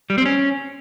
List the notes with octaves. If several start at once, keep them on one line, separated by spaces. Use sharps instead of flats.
G3
C4
C#4